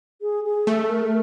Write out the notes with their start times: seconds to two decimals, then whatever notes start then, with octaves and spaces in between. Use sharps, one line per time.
0.22 G#4
0.44 G#4
0.67 A3 A4
0.90 A#4